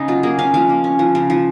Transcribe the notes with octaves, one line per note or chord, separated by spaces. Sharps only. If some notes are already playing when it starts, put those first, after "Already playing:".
Already playing: C#3 D#4
F#3 F4
A#3 G#4
C#4 F5
F3 F5
A#3
C#4
F3
C#3
F3